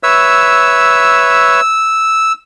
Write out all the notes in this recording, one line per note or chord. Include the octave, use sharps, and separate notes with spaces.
B4 C#5 E5 E6